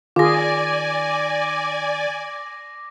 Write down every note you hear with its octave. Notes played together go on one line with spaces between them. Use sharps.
D#3 F4 G#4 D5 G#5 D6 A#6